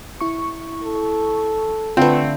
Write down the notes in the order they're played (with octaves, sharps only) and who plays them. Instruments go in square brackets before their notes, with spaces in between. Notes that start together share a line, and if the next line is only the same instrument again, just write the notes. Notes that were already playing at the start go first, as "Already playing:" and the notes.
[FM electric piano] E4 C#6
[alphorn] A4
[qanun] D3 A3 [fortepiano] C4 [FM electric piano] F4 B4